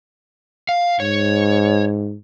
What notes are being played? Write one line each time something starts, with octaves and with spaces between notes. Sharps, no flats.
F5
G#2 C#5